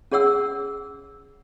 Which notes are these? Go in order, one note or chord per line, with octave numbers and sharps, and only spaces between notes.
C#4 G#4 C#5 F#5 E6